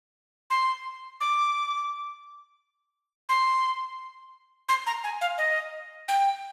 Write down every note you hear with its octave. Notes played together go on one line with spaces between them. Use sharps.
C6
D6
C6
C6
A#5
G#5
F5
D#5
G5